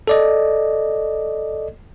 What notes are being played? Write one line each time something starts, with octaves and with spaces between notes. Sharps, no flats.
A4 D5 D#5